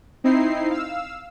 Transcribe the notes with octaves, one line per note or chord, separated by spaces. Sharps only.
C4 D#4 E4 C7
F5 E6